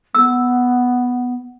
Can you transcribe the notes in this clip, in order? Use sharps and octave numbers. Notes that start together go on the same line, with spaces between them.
B3 E6